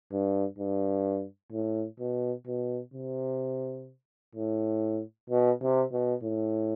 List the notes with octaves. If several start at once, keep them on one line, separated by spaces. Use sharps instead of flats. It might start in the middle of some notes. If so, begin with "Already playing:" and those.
G2
G2
A2
B2
B2
C3
A2
B2
C3
B2
A2